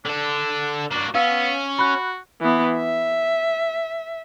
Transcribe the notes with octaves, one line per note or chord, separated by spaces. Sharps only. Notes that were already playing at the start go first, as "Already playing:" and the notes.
D3 D4 A4
A#3 D4 F#4
B3 C#4 F5 E6
F#4 B5 F#6
E3 B3
E5